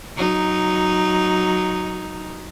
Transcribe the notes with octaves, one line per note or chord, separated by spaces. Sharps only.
F#3 D#4